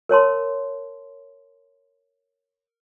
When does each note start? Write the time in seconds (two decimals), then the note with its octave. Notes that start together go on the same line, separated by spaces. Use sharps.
0.09 A#4 C#5 A5 C6